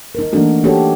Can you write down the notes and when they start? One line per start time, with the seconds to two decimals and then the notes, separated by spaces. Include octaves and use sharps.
0.15 D#4 A#4
0.32 E3 A3 A#3 D4 F#4 A4
0.64 D#4 F#4 G4 A4 C#5